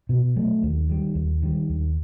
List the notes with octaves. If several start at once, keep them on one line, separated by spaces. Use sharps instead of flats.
B2
F#3 A3
D#2
D#3 G3
D#2
D#3 G3
D#2